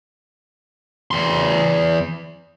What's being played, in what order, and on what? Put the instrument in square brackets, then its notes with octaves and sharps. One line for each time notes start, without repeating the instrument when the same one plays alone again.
[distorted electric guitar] E2 C6